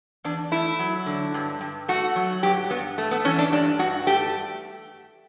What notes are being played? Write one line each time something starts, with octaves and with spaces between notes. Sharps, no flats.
E2 D4
A3 E4
F#3
D3
G2
G2
A3 F#4
F#3
G2 G4
G2 B3
A3
B3
E3 C#4
D4
G2 D4
G2 F#4
A3 G4